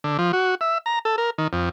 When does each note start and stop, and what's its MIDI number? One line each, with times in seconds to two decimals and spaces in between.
0.04 0.17 50
0.19 0.32 53
0.33 0.55 66
0.61 0.78 76
0.86 0.99 82
1.05 1.16 69
1.18 1.30 70
1.38 1.48 51
1.53 1.69 41